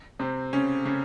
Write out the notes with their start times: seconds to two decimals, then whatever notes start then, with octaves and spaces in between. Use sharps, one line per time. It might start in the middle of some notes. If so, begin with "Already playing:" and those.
0.19 C3 C4
0.53 C#3 C#4
0.85 C#3 C#4